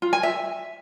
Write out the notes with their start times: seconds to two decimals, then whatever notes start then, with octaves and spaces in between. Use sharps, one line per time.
0.02 F4
0.13 G#5
0.23 E5